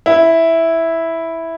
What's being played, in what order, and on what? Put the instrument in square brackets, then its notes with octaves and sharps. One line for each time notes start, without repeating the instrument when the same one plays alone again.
[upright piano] E4